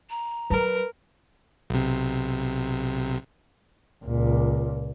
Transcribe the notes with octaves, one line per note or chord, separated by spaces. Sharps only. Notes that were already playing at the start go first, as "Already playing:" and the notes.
A#5
F#3 A#4 B4
B1 C3
C#2 A#2